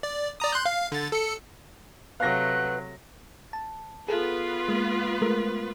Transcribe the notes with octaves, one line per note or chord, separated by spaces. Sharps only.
D5
D5 A#5 D#6
C6 F#6 G6
F5
D3 A6
A4 C#7
C3 F#3 A3 B4 F5 F#5 F#6 A#6
A5
B3 F4 G#4 A4 B4
G#3 A#3
G#3 A3 A#4